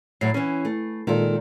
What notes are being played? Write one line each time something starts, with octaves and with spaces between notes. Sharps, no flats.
A2 F#3 C7
E3 C#4
A3
A#2 D#3 G#3 F4 A4